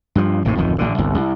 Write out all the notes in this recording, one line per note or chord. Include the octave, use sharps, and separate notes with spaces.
G2 F3
A1 D#2 A2 C3
D1 F2 D#3
A1 D3
G1 C2
C2